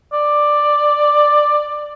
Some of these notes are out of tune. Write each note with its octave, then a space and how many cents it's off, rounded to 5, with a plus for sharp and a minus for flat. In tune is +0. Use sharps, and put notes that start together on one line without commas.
D5 +10